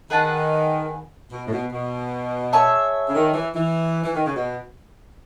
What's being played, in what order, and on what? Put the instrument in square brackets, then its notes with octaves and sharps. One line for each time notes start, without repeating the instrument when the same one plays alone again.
[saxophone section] D#3 [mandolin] G#4 B4 F#5 A5
[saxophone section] B2
A2
B2
B2
[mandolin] G#4 C#5 E5 A5
[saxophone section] C#3
D#3
E3
E3
E3
D#3
C#3
B2